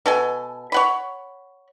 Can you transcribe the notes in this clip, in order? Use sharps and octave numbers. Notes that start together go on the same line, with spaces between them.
B2 A4 G#5
C#5 F#5 B5